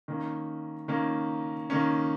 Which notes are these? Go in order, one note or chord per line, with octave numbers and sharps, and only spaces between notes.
D#3 A#3 C#4
D#3 A#3 C#4
D#3 A#3 C#4